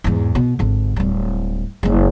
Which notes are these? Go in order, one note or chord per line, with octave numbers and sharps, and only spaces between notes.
E2 G#2
B2
G#1 D3
D1 G3
F#1 G#3